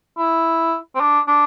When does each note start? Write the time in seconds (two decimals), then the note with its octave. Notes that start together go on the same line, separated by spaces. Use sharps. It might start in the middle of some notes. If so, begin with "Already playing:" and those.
0.18 E4
0.95 C4
1.00 D4
1.28 D4